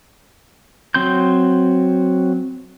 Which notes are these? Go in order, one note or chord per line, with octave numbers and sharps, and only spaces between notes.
F#3 C4 C6 G6